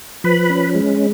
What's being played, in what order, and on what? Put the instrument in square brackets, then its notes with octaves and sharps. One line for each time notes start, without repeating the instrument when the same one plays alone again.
[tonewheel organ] F3 B4 B5
C#4
G#3